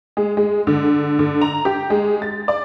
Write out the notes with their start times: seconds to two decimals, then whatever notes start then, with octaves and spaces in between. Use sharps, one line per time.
0.17 G#3
0.37 G#3
0.67 D3
1.19 D3
1.41 A#5
1.65 G4
1.90 G#3
2.22 A6
2.48 D5